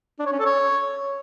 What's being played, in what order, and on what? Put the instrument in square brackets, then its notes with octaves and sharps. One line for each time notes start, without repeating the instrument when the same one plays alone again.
[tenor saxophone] D4
C#5
C#4
A4
C#5